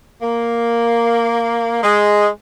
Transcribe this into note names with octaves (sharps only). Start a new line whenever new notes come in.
A#3
G#3